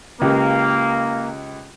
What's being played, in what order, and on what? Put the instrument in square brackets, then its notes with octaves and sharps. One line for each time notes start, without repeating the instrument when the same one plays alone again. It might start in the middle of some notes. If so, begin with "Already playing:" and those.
[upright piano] C#2 G4 [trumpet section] A#3